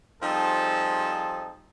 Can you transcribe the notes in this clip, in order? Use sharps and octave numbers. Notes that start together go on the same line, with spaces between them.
F3 G3 C4 D#4 G#4 A4